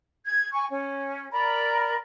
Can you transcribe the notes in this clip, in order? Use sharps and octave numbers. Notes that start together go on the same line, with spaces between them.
G#6
G#5 C#6
C#4
A#4 D5 A#5 B5